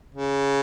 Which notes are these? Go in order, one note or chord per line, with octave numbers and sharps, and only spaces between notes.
C#3